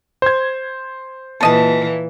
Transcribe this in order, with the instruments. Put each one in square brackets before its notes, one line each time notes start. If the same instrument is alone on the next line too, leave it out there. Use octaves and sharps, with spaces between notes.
[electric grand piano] C5 G#6
[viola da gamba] A#2 E3 [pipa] A4 D#5 A5